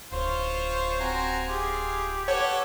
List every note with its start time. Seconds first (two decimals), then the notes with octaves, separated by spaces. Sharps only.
0.12 D1 F4 C5 C#5
1.00 C4 F#4 G#5 A#5
1.48 F4 G4 G#4
2.28 A4 B4 C#5 F#5 G#6